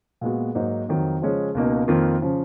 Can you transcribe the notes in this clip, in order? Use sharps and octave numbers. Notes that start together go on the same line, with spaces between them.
A#2 G#3 B3 F#4
G#2 F#3 A#3 D#4
F2 D#3 F#3
C#3 F3 G#3 C#4 G#4
C#2 B2 A#3 D#4
F2 D#3 A#3 F4
C#3 F3